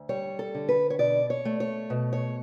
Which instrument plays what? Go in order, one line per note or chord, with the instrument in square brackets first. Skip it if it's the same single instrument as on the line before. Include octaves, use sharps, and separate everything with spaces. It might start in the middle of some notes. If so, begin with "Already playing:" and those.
Already playing: [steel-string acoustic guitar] D2
G3 C#5
A4
D3
B4
C#5
B2 D5
C#5
A3
C#5
B2
C#5